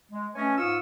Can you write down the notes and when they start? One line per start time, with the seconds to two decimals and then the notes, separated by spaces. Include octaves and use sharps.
0.12 G#3
0.35 A3 C#4 B4 C#5 D#5 G#5
0.57 G#2 F4 C#6 D#6 E6